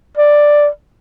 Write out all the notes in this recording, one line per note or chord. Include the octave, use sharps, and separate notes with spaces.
D5